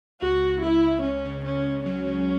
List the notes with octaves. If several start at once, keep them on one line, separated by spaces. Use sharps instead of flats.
C#2 F#4
C#2
C#2 E4
C#2
C#2 C#4
C#3
C#2 C#4
C#2
F#3 C#4
C#3